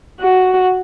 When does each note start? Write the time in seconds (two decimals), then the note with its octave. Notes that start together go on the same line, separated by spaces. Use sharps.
0.21 F#4